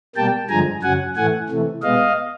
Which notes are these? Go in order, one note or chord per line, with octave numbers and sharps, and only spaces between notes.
B2 G3 A#3 G5 A5
G2 D3 F3 G#3 G#5 A#5
F#2 C#3 F#3 F#5 G#5
A2 E3 A3 F#5 G#5
C3 E3 A3
B2 G#3 B3 D#5 F5